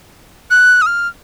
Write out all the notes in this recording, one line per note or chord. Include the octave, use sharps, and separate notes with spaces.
F#6
D#6
F6